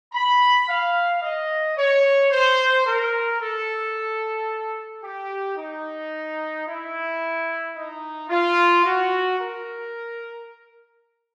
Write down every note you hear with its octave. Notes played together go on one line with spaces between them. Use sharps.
B5
F5
D#5
C#5
C5
A#4
A4
G4
D#4
E4
D#4
F4
F#4
A#4